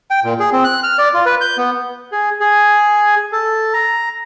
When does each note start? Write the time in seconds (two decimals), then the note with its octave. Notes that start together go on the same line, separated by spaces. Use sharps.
0.11 G5
0.24 A#2
0.40 G#4
0.52 C4
0.64 F#6
0.83 F6
0.99 D5
1.14 F4
1.26 B4
1.41 G6
1.58 B3
2.12 G#4
2.40 G#4
3.32 A4
3.74 A#5